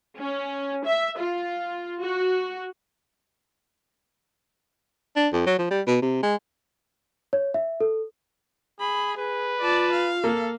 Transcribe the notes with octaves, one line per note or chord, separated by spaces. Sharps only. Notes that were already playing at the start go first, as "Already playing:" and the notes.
C#4
E5
F4
F#4
D4
F2
F#3
F3
G3
B2
C3
G#3
C#5
E5
A4
G#4 B5
G#4 B4
F4 D5 A5
F5
A#3 A4